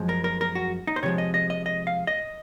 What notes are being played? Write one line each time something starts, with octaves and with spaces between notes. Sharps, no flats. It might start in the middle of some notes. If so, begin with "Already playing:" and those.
Already playing: F#2 F3 G#3
A#4
A#4
A#4
F#4
D#4
C5
C3 F3 G#3 C#5
D#5
D#5
D#5
D#5
F5
D#5